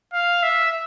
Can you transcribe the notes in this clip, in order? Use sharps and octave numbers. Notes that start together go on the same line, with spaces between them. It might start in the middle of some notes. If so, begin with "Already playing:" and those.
F5
E5